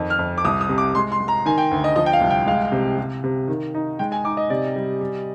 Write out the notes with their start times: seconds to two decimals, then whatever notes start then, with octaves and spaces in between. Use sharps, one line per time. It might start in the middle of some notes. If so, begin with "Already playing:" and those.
Already playing: F2 D#3
0.10 F6
0.19 F2
0.38 D6
0.45 C2 D#6
0.61 D#6
0.69 C3
0.78 D6
0.94 G#3 C6
1.12 C6
1.20 G#3
1.28 A#5
1.46 D#3 G#5
1.58 G5
1.71 D2
1.84 D#5
1.96 F3 D#5
2.06 G5
2.13 F5
2.21 C2
2.30 G5
2.46 G#3 F5
2.72 C3
2.98 C3
3.24 C3
3.48 D#3
3.75 D#4
3.99 G#3 G5
4.12 G#5
4.24 D#4 D6
4.37 D#5
4.50 C3 D5
4.76 G3
5.01 G3